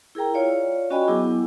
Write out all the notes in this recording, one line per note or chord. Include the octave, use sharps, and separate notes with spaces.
E4 G#4 A#4 G5 A#5
F4 C#5 D5 F5
C#4 F#4 D#5 G5 G#5 B5
F#3 B3 E4 G#4 D6